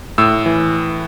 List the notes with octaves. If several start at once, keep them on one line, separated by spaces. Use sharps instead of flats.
A2 E6
E3